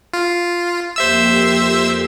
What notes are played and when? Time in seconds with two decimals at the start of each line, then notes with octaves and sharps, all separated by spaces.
0.14 F4
0.96 F2 A#3 G4 C5 E5 E6